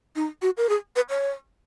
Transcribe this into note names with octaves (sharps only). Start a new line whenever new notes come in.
D#4
F#4
A#4
G#4
B4
C#5